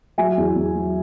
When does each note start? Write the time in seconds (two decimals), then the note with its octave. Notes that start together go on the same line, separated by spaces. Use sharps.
0.18 F#3 E5 G#5
0.38 E2
0.56 E2
0.75 F#3